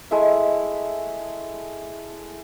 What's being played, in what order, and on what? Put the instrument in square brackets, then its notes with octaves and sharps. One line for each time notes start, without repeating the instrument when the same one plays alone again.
[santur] G#3 A3 E4 E5